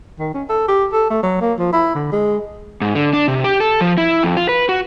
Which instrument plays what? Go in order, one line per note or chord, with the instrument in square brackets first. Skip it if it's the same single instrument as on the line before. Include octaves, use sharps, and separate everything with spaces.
[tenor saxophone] D#3
C#4
A4
G4
A4
A3
F#3
A#3
F3
E4
D3
G#3
[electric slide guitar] G#2
D3
D4
C3
G4
A4
F3
E4
F2
F4
B4
F#4